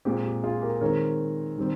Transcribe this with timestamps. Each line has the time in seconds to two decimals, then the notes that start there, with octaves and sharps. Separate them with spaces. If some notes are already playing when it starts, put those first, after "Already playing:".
0.05 A#2 G#3 C4 G4
0.24 G4
0.43 F4 G#4
0.62 G4 A#4
0.81 D#3 G#3 C4 A#4 C#5
1.58 D#3 G3 C4